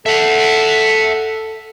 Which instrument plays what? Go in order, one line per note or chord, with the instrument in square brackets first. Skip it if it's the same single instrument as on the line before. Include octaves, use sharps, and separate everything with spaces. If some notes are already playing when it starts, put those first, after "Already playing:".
[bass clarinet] A4 [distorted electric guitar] E5 F#5